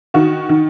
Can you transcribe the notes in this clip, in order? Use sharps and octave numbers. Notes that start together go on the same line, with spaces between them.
D#3 F#4
D#3